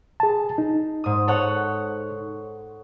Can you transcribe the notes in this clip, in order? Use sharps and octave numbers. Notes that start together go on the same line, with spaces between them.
G#4 A5
D#4
G#2 D#6
A4 C#5 F#5